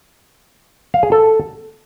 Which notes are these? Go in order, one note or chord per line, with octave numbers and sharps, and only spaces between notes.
F5
G#4
A4